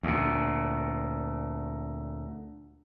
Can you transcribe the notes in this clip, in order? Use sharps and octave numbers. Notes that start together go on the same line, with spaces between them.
D2 A#2